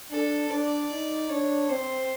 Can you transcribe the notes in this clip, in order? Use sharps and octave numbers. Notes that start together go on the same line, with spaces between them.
D4 A4
D4 D5
D#4
D4 C#5
C4 C5